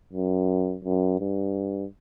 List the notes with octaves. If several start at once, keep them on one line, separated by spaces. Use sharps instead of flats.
F#2
F#2
G2